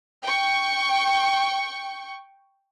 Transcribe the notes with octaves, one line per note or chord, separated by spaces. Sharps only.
G5 C#6